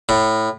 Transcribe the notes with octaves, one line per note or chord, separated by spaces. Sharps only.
A2